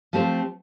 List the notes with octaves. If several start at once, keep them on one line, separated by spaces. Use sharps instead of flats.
F3 A3 C4 G4 C5